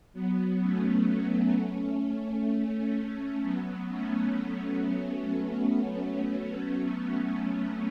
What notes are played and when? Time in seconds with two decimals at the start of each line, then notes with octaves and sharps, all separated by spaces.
0.13 F#3 B3
0.60 A3 C#4
1.07 F#3 B3
1.54 A3 C#4
3.41 F#3 B3
3.89 A3 C#4
4.35 F#3 B3
4.66 A3 C#4